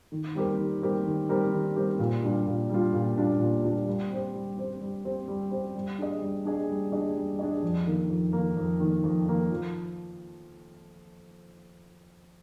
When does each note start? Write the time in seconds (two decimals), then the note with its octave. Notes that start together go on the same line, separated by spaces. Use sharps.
0.12 D#3
0.35 G3 C4 G4 A#4
0.58 D#3
0.82 G3 C4 G4 A#4
1.06 D#3
1.29 G3 C4 G4 A#4
1.52 D#3
1.76 G3 C4 G4 A#4
1.99 A#2
2.23 G3 D4 F4
2.46 A#2
2.70 G3 D4 F4
2.93 A#2
3.17 G3 D4 F4
3.40 A#2
3.64 G3 D4 F4
3.87 G3
4.11 C4 G4 C5
4.34 G3
4.57 C4 G4 C5
4.81 G3
5.05 C4 G4 C5
5.28 G3
5.51 C4 G4 C5
5.75 G3
5.98 D4 G#4 D#5
6.22 G3
6.45 D4 G#4 D#5
6.69 G3
6.92 D4 G#4 D#5
7.15 G3
7.39 D4 G#4 D#5
7.62 F2
7.86 D#3 A#3
8.09 F2
8.33 D#3 A#3
8.57 F2
8.80 D#3 A#3
9.04 F2
9.27 D#3 A#3
9.51 F3